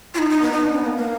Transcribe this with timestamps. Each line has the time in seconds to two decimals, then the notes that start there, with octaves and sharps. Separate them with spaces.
0.14 F4
0.18 D#4
0.30 D#4
0.42 B3
0.52 D#4
0.64 D4
0.75 B3
0.86 A#3
0.97 A#3